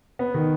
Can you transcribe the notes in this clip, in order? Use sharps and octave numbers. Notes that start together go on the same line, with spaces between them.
B3
D#3